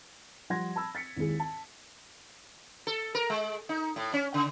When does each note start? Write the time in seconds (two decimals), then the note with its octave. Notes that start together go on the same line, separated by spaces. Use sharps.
0.50 F3 G3 F#5 C6 G#6 A#6
0.76 A5 B5 E6
0.95 A6 B6 C#7
1.16 G#1 D#2 G#2 E4 G#4
1.40 A5
2.87 A4
3.15 A#4
3.30 G#3
3.69 D#4
3.96 A2
4.13 C#4
4.34 C#3